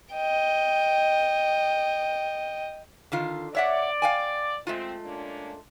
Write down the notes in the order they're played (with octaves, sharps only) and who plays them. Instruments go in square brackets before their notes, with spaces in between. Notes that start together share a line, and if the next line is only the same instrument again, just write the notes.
[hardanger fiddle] D#5 G5
[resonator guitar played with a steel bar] D3 D#3 F4
[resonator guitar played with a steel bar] C#5 E5 F#5 [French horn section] D5
[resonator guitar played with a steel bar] F5 G5 G#5
[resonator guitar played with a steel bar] G#3 A3 F4 [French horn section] C4
[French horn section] A#3 C#4 D4